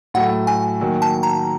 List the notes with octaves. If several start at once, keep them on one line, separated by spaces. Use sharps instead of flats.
A2 F#3 A3 F#5
G#5
D#3 F#3 A#3
A5
A#5